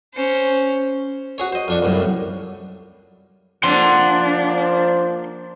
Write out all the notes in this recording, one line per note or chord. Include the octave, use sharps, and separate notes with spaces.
C#4 C5
F#4 G#4 C#5
C5 D#5
F2 D4 C#6
C2 F#2 A2
F3 A#3 D4 C5 F#5 C6